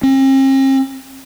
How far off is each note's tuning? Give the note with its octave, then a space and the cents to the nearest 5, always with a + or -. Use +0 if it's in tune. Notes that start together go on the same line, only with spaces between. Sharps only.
C4 +45